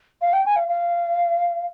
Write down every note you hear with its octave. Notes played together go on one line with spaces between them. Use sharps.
F5
G5
G#5
F5
F5